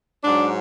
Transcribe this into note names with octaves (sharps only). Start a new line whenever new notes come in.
G#2 F#3 D4